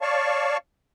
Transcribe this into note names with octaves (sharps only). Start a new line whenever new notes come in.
C#5 D5 F5 A5 C#6